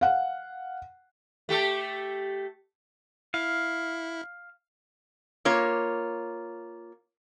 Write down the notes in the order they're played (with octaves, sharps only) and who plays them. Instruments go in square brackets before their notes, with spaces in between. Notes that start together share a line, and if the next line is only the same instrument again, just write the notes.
[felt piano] F5 F#5
[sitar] A3 G4 A4
[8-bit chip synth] E4 [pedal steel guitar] F5
[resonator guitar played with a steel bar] A#3 F4 C#5